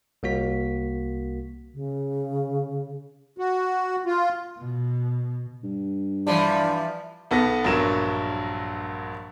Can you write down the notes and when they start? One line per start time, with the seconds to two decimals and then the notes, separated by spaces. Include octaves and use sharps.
0.23 C2 A#3 F#4 B6
1.74 C#3
3.38 F#4
4.06 F4
4.58 B2
5.63 G2
6.27 E3 F3 G3 D4
7.31 B1 B3 A4 A#6
7.64 A#1 G2 F#3 A#4 E7